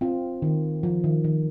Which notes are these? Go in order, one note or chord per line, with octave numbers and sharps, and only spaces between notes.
C4 F4
D#3
F3
D#3
D#3